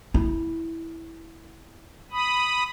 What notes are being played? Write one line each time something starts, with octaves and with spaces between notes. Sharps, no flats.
E4
B5 D#6